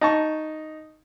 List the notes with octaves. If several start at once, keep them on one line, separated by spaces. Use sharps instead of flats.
D#4 A5 C#6